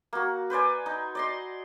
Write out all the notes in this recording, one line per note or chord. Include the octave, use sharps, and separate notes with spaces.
A#3 F#4
B4 C5 D5 G#5
D#4
D5 D#5 C6